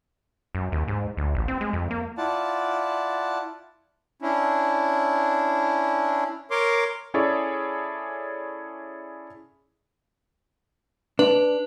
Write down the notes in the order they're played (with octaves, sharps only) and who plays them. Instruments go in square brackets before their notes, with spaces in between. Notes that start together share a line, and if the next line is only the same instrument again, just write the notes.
[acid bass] F#2
D#2
G#2
D2
A1
C4
G#3
F2
A#3
[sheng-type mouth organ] E4 F4 D5 F#5 A5
[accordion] C#4 D4 E4
A#4 C#5 C6 D6
[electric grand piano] C#4 E4 G#4 A4 C#5 D5
[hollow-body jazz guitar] D4 [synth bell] B4